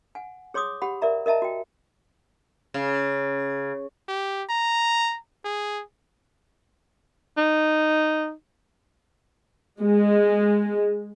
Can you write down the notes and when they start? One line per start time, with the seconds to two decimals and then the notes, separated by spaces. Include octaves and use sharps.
0.15 F#5 G#5
0.54 G#4 C#5 C6 D6 D#6
0.82 G4 F#5 B5
1.02 A#4 D5 E5 A#5
1.26 A#4 D#5 E5 A5 A#5
1.42 F#4 G5
2.74 C#3
4.09 G4
4.50 A#5
5.45 G#4
7.37 D#4
9.81 G#3